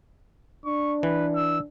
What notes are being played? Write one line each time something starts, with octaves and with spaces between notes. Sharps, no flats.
D4 C#6
E3 B4
E6